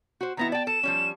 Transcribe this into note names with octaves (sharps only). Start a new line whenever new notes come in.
F#4 C5
D#3 B3 E4 A#5
D5 G5 A5
A4 E7
F3 G3 C#4